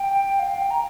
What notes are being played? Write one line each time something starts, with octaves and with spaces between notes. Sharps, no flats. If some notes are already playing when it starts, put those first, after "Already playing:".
Already playing: G5
F5
G5
A#5